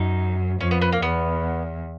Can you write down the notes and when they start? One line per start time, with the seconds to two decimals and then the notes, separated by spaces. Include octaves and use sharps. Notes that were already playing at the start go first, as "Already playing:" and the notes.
Already playing: F#2 D#4
0.60 F2 C#4
0.71 B3
0.82 B3
0.92 A#3
1.02 E2 B3